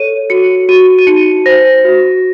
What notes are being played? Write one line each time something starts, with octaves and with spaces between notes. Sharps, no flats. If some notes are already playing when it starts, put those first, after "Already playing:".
Already playing: A4 C#5 D#7
F#4 C#7
F#4 D#7
D#7
D#4 C#7
C5 A#6
F#4